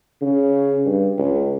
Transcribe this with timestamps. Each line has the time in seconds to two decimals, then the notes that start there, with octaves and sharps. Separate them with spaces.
0.21 C#3
0.86 G2
1.18 C#2